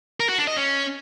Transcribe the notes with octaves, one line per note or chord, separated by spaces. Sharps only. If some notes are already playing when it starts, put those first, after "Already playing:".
A#4
F#4
D4
D#5
C#4